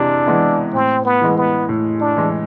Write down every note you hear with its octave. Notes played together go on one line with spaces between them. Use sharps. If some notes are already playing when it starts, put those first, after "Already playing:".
Already playing: C3 E3 G#3 D4
E3 G#3 B3 E4
A2 C4
B3
E3 G#3
B3
A2
D4
E3 G#3